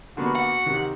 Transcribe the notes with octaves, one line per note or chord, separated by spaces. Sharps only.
D3 A#3 B3 F#4
F#5
C3 D#3